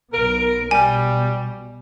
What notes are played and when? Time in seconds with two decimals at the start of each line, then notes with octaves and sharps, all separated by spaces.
0.13 B1 B3 A#4
0.71 B2 G3 G#5